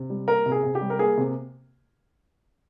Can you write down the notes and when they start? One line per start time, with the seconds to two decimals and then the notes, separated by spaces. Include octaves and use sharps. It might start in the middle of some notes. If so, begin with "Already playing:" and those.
Already playing: C3
0.10 G3
0.28 A#3 A#4
0.46 C3
0.52 G#4
0.63 C3
0.75 G4
0.81 G3
0.90 A#4
0.99 A#3 G#4
1.18 C3